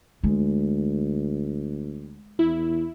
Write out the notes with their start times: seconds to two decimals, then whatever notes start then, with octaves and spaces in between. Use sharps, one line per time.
0.24 D2 G#3
2.39 E2 E4